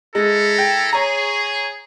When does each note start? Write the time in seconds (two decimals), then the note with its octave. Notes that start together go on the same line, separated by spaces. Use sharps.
0.15 G#3 E4 A4 A#5
0.58 G5
0.93 G#4 C#5 A#5